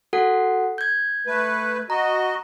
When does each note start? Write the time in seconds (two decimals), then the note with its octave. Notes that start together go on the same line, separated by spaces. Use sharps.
0.13 F#4 A4 F#5
0.78 G6 G#6
1.27 A3 B4
1.90 F#4 D#5 A#5